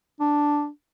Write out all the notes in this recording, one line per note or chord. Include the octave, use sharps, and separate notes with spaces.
D4